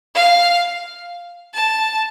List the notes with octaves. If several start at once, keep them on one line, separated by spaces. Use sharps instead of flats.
F5
A5